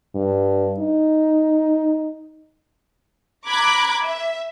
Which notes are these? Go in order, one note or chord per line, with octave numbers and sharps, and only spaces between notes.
G2
D#4
A#5 B5 D6 F#6 G#6
E5